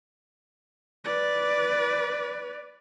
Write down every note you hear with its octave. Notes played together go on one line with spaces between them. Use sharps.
B4 D5